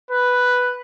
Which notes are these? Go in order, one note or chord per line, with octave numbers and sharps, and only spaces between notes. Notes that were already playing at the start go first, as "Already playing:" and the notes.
B4